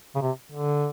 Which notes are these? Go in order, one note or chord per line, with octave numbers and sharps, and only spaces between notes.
C#3
C3
D3